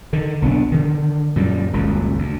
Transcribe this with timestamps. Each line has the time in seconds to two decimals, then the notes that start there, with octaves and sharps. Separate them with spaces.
0.13 D3 D#3
0.42 B1 B3 D4
0.72 D3 D#3
1.36 F#2 A#2 G3
1.73 D#1 C#2 F#2
2.19 D2